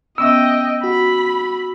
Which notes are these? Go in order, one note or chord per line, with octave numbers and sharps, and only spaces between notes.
B3 C#4 D#5 E5 G5 E6
F#4 B5